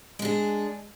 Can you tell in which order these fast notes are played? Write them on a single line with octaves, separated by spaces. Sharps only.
G#3 D4 G#4